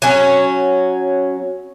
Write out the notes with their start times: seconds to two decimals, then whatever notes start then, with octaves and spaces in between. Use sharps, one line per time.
0.02 F#3 C#4